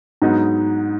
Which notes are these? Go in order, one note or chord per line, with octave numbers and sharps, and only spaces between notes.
G#2 F#3 B3 D#4